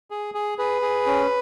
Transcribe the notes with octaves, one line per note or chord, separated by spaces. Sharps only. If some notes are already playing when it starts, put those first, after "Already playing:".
G#4
G#4
G#4 B4
G#4
C#4